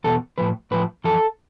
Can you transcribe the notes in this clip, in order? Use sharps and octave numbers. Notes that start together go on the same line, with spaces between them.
E2 B2 A4
A2 F3 B4
A2 F3 B4
F2 E3 A4